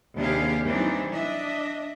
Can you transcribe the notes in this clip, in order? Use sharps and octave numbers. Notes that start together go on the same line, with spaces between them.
D#2 C3 D4 G4 G#4 F5
E3 F#3 G3 C4 D4 D#4
D4 D#5 E5